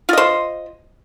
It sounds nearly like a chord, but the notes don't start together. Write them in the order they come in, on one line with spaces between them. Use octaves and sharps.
F4 D#5 C5